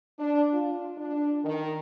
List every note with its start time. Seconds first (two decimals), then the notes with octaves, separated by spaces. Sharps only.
0.19 D4
0.54 F4
0.98 D4
1.44 D#3